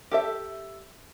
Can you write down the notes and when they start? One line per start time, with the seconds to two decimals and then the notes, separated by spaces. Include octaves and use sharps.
0.11 G4 A4 E5